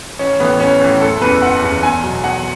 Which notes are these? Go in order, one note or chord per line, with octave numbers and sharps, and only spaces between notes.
A1 C#4
A2 E3 B3
A1 C#4
A2 E3
F#1 A4
E2 C#3 E3 B4
F#1 F#5
E2 C#3 E3
E2 G#5
B2 F#3
E2 F#5